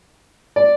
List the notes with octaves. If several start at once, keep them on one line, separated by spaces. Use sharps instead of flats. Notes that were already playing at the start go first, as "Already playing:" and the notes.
D5